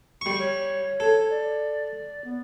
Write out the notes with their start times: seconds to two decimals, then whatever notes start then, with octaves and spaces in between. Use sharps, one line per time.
0.21 G3 C#6
0.39 C#5
1.00 A4
1.30 D5
2.25 B3